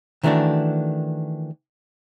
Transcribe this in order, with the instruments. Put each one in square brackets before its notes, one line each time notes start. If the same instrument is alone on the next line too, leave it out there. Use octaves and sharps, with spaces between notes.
[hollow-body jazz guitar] D#3 E3 A3 B3 D4 F#4